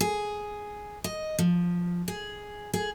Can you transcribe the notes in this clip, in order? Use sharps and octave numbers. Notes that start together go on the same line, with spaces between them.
G#4
D#5
F3
G#4
G#4